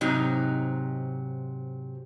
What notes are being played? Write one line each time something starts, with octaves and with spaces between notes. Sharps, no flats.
G#2 C3 F#3 D#4